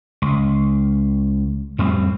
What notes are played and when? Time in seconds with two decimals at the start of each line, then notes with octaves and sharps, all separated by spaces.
0.22 C#2
1.78 F2 A2 G3 C4